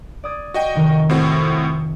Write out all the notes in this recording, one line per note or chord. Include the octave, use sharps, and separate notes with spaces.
D5 D#6 G#6
F#4 D#5 G5
F1 D#3
A2 C4 F#4